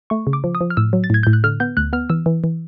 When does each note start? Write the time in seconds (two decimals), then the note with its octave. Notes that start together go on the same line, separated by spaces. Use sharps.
0.10 A3 C#6
0.27 C#3
0.33 D6
0.44 F3
0.55 D#6
0.61 F3
0.70 F6
0.77 A2 E6
0.93 F#3
1.04 A6
1.10 A2 G#6
1.23 A2 G6
1.33 F#6
1.44 D3 F6
1.60 B3 G6
1.77 D2 F#6
1.93 B3 F6
2.09 E3 E6
2.26 E3
2.44 E3